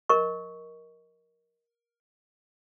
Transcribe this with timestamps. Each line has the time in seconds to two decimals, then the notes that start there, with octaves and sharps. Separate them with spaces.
0.09 A#4 D#5 C#6